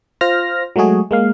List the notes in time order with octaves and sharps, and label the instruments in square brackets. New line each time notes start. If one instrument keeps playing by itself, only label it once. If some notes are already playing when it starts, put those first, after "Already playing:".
[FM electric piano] F4 C5 F6 A#6
F#3 G#3 A3 F#4 G#4
G#3 A#3 F5